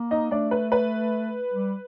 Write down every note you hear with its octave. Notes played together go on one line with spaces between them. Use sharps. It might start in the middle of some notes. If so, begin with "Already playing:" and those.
Already playing: A#3
D#4 D#5
A3 D4 D5
B4
B4
G3